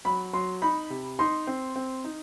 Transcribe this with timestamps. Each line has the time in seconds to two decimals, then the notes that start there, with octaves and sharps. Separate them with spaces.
0.05 F#3 B5
0.33 F#3 C6
0.62 D#4 B5
0.90 C3
1.19 D#4 C6
1.47 C4
1.76 C4
2.04 D#4